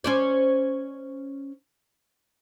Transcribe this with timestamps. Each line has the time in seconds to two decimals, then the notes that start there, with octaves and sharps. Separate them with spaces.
0.04 C#4 C5 D5